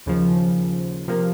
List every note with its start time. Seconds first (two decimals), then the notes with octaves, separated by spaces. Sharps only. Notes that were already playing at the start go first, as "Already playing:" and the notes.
0.06 D#2 C#3 F3
1.08 C3 F3 A#3